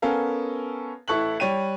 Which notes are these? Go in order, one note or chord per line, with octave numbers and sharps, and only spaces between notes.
B3 C#4 A4 A#4 F5
A1 E4 A4 C#6 F#6 F#7
G3 C#5 G5 D#7